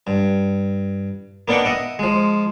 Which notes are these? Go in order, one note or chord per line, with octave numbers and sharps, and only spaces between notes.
G2
A#3 B3 D4 D#4 F#5 G5
D#5 E5 F#5
F3 G#3